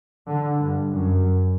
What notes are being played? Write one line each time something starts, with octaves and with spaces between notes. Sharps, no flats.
D3
G2
F#2